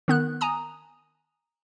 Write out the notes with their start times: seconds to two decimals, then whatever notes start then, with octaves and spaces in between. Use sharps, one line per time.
0.08 D#3 B3 F#6
0.41 G#5 A#5 D#6